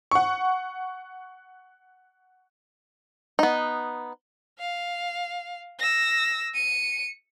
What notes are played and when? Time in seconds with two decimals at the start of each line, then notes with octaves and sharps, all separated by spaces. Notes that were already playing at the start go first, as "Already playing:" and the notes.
0.11 F#5 C#6
3.39 B3 D#4
4.59 F5
5.79 E6 A#6
6.55 C#7 D#7